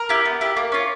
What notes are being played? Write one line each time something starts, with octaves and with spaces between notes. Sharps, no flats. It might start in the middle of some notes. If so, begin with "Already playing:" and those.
Already playing: A#4
E4 G4
B3
E4 G4
A#3
C#4 F4